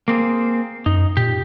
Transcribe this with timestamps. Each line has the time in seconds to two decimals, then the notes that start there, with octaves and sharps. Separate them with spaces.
0.08 A#3 C4 G#4
0.86 F#2 D#4
1.17 A#2 G4